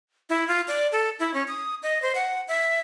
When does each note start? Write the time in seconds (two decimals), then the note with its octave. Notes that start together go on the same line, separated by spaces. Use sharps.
0.30 E4
0.48 F4
0.68 D5
0.92 A4
1.20 E4
1.34 C#4
1.48 D#6
1.83 D#5
2.02 C5
2.15 F#5
2.48 E5